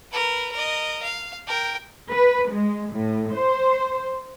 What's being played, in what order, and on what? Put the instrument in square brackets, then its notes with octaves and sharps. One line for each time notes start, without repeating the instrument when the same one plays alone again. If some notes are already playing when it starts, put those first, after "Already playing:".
[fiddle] A#4 B4
A#4 D#5
F5
A#4 G5
[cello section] B4
G#3
A2
C5